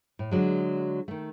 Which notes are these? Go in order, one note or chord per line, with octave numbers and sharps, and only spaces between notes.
A2
D3 F#3 G#3
D#3 A3